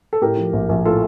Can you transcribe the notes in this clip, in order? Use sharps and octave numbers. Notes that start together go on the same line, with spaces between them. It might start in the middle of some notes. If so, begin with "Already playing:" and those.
A4
A2 G4 A#4
F3
A#1
A#1
A2 F4 A4